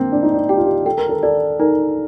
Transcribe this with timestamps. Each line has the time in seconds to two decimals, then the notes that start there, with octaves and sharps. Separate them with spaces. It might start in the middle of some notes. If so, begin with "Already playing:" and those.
Already playing: A#3 C4
0.12 D4 G5
0.23 D#4
0.33 D4
0.49 G4 G5
0.57 F4
0.65 G4
0.86 A4 G5
0.98 A#4
1.09 A4
1.23 A4 D5
1.60 D#4 A#4